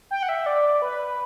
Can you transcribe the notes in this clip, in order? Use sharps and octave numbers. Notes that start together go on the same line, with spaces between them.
G5
F#5
E5
D5
B4